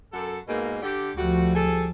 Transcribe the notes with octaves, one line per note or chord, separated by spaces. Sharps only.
F#2 F#4 A4
G#2 B2 A#3
D3 G4
D2 F3 G3 A3 F#4
G3 G#4 A4